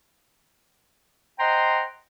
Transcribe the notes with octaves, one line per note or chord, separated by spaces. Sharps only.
C5 D#5 F#5 G5 A#5 C6